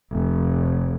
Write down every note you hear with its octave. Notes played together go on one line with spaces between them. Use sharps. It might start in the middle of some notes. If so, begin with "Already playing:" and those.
F1